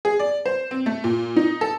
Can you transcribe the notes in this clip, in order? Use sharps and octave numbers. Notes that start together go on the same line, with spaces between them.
G#4
D5
C5
C4
A3
A#2
D#4
A4